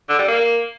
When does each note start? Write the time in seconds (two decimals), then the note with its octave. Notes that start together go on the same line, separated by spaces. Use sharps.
0.09 D3
0.19 G3
0.28 A#3